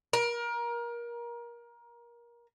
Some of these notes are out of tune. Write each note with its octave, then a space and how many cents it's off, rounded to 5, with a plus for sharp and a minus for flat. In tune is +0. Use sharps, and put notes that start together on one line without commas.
A#4 +25